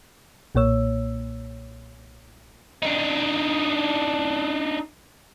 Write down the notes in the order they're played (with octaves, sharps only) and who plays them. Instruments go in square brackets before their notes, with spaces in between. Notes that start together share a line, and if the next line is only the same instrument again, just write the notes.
[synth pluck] B1 A#2 A#3 C#5 E6
[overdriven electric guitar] D4 D#4